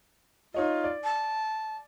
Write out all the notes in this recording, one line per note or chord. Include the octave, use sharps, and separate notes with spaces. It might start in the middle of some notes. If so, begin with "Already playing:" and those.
D#4 F4 C#5 D#5
D5
A5